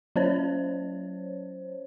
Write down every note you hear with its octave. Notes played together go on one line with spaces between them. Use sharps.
F#3 C#4 C5 C#5